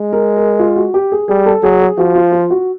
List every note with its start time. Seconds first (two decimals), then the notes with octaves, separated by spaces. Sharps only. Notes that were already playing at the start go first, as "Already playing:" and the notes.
Already playing: G#3
0.13 A#4
0.37 A#4
0.59 F4
0.76 F#4
0.94 G4
1.12 G#4
1.28 G3 G#4
1.46 A4
1.63 F#3 G#4
1.81 G#4
1.98 F3 F#4
2.15 F4
2.32 F4
2.51 F#4